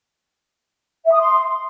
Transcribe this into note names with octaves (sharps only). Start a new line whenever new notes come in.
E5
D#6
C6